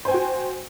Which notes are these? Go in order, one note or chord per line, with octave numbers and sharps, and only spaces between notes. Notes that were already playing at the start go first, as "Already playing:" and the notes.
F#4 C5 G5 G#5